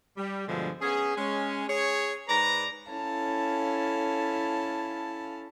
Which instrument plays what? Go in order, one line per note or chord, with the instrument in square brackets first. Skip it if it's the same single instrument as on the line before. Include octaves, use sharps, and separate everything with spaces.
[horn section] G3
G2 B2 D3 F3 G#3
B3 C#4 G#4
G#3 C#4
G#4 C#5
G#2 B4 D5 A#5
[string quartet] C#4 E4 A4 F5 A5